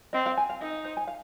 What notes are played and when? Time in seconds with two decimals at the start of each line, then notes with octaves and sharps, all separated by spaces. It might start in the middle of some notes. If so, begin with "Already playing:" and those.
0.13 C4 D#5
0.26 F5
0.37 G#5
0.49 F5
0.61 D#4 D#5
0.84 C5
0.97 G#5
1.07 F5